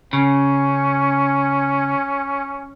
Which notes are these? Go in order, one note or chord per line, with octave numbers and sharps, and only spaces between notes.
C#3 C#4